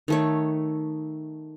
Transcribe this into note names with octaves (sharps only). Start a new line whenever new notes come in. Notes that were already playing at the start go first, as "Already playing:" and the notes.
D#3 A3 C#5